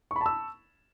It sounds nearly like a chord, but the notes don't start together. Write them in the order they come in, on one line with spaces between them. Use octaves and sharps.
C#6 B5 A5 E6